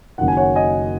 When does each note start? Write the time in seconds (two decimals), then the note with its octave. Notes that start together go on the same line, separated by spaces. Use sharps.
0.18 F#1 F#2 D#3 F#5
0.28 G#5
0.37 C#5 F#5
0.55 D#5 G#5